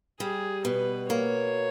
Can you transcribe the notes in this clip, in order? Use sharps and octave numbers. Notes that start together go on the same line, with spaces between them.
G3 G#4
B2 B4
A#3 C#5